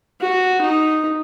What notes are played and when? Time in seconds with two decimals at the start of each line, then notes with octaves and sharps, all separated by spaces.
0.21 F#4
0.62 D#4